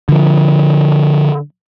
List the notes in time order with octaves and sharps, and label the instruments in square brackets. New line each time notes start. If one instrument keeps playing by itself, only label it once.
[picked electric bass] D3 F3